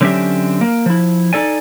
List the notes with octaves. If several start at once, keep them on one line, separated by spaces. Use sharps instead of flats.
D3 F#3 C4 C#4 G4 E5
A#3
F3 E4
D#4 A4 D5 G#5